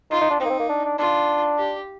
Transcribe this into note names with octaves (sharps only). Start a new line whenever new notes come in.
D#4 F4
D#4
D4
C4 D#4
A#3
C4
A#3
D4
D4
D4 F4
G4